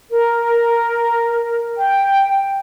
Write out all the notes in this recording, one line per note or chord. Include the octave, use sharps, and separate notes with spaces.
A#4
G5